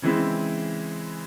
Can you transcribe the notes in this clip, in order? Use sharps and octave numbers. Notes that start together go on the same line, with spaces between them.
C#3 E3 G#3 C4 E4